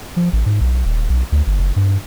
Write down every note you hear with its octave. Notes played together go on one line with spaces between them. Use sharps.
F3
A1
G#2
B1
D#1
B1
D2
G1
F#1
G2